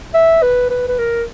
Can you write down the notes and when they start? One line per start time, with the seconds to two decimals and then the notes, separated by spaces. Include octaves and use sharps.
0.14 E5
0.42 B4
0.70 B4
0.88 B4
0.98 A#4